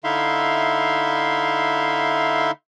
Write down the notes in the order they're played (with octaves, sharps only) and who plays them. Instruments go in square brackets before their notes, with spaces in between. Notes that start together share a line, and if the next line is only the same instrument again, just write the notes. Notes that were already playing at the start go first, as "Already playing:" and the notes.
[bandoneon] D3 D#4 E4 E5 F5 C6